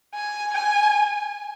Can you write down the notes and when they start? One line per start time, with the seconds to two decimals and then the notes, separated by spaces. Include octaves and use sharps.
0.15 G#5
0.54 G#5